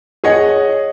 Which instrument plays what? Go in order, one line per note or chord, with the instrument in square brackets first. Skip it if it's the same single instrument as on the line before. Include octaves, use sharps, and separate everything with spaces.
[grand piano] G#4 C#5 D#5 F#5